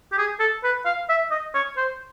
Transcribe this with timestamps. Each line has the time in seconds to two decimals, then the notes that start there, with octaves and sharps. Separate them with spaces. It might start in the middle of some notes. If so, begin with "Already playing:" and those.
0.12 G4
0.18 G#4
0.40 A4
0.64 B4
0.85 F5
1.09 E5
1.31 D#5
1.54 C#5
1.77 C5